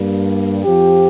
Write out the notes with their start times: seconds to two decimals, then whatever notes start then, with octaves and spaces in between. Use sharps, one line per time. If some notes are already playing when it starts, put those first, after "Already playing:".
Already playing: G2 G3 A#3
0.64 F2 F3 C4 G4